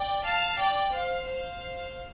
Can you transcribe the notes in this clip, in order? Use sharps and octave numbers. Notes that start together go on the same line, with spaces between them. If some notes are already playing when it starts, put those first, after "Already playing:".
Already playing: D5 G5
F5 A5
D5 G5
C5 F5
C5 F5